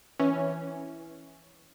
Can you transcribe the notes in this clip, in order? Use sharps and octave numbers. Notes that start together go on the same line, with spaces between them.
E3 C#4